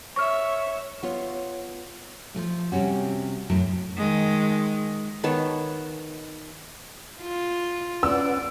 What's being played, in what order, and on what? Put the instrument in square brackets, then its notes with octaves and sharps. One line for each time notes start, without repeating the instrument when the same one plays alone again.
[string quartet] C#5 E5 [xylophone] C#6 F6
[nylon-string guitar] B3 F4 C#5
F3 F#3 A3
C3 G3 C#4 F#4
F#2 A2 F#3 A5
[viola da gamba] D#3 G#3
[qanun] D#3 B3 C#5 A5
[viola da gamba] F4
[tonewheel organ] C#4 B4 F#5 [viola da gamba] D5 [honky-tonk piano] E6